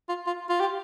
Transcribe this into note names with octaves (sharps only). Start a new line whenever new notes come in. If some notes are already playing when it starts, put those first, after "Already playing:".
F4
F4
F4
G4